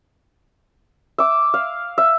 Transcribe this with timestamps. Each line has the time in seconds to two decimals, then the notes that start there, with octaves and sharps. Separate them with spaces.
1.18 E5 D6
1.54 F5
1.98 E5